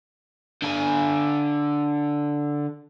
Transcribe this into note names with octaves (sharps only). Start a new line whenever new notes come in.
D3 G#5